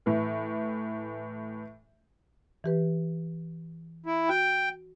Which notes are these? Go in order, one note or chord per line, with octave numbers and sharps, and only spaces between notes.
A2 E3
E3 G4 B4
E4
F#4 G5